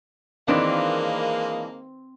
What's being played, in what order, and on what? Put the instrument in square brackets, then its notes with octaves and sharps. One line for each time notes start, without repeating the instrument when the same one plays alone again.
[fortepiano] D#3 D#4 B4 [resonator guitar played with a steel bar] E3 D4 [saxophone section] G#3 A#3 [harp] C4